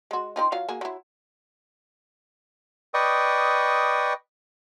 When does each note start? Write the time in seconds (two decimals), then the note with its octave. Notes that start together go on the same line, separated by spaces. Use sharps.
0.11 G#3 F#4
0.36 C4 D#4 F4
0.52 F#3 F4 F5
0.69 A#3 F#4 G#4
0.81 F#3 E4
2.94 B4 D5 D#5 G5 C#6 D#6